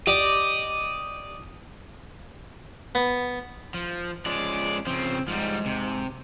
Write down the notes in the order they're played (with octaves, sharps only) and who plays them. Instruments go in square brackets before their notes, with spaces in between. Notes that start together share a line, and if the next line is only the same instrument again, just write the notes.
[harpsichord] G4 D5 D6 [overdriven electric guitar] D#5
[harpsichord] B3
[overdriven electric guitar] F3
[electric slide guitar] F3 G#3 C#4 [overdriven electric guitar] D5
[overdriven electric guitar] C#3 F3 [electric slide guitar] C4
[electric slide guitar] G#2 [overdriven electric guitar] F3 G3
[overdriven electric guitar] C3